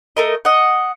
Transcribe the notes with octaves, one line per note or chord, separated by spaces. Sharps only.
A3 A#4 D#5
D#5 F#5